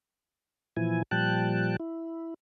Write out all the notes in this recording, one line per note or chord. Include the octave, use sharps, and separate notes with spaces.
A#2 E3 F3 E4 G#5
A#2 F3 G3 G5 A5 F#6
E4